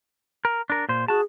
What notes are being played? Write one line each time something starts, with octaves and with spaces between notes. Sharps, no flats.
A#4
D4 A#4
A#2 C5
F#4 G#4 A5